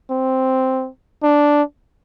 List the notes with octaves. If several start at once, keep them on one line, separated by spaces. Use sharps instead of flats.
C4
D4